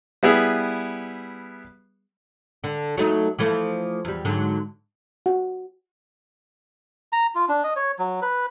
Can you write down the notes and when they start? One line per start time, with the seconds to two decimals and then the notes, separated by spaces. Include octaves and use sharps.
0.23 G3 B3 E4 G#4
2.64 D3
2.97 F#3 A3 D#4
3.39 E3 F3 A3
4.05 E2 G3
4.25 G#2 D3 F#3
5.26 F#4
7.13 A#5
7.35 F4
7.49 D4
7.64 D#5
7.76 C#5
7.99 F#3
8.22 B4